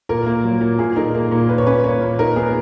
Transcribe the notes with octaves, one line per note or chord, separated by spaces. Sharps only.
A#2 A#4
A#3
F#3
A#2
A#2 G#4
D#4 A#4
A#3
A#2
A#2 B4
C#5
C#4 B4
A#3 C#5
A#2
D#4 A#4
B3 G#4